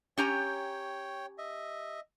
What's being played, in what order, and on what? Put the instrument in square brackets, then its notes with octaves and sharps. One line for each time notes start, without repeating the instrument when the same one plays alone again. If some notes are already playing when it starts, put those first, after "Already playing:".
[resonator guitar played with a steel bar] C#4 G4 A#5 [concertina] C#5 G5
[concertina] D#5 E5